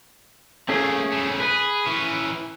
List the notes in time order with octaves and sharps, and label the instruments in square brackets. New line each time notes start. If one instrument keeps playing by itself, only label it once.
[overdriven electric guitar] A3 A#3 [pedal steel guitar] C#4 G#4
[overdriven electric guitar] C#3 A3
[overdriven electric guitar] G#4 [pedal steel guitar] B4
[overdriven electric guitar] E3 C#4